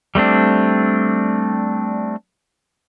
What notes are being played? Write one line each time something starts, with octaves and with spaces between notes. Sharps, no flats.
G3 A3 C4 D4